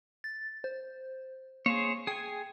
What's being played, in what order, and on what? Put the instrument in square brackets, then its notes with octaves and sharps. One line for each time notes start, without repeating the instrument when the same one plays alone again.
[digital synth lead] A6
C5
[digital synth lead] A#3 [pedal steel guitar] G#4 C5 C#5
[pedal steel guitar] G#4 G#5 [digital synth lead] G5